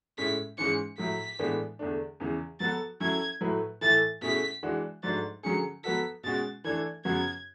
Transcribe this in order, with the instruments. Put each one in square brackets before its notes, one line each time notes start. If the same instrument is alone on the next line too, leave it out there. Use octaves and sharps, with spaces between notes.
[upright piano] A2 G#3 C#4 E4 [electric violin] B6
[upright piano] G#2 E3 G#3 C#4 G#4 [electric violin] C#7
[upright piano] A2 F#3 A3 E4 [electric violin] B6
[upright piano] A2 E3 G#3 B3 D4
E2 D3 A3 D4
E2 C#3 E3
[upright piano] F#3 B3 F#4 A4 [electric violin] A6
[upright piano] F#3 C#4 E4 A4 [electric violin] G#6
[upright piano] A2 F#3 A3 E4 B4
[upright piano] A2 E3 A3 E4 A4 [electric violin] A6
[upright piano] B2 A3 C#4 E4 G#4 [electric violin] B6
[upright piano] E3 G#3 D4 F#4
[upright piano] G#2 F#3 A3 D4 [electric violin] A6
[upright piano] D3 F#3 C#4 G#4 [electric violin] C#7
[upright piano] F#3 B3 F#4 A4 [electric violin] B6
[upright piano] B2 G#3 C#4 F#4 [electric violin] A6
[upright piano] E3 A3 D4 A4 [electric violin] G#6
[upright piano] F#2 C#3 F#3 B3 F#4 [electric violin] G#6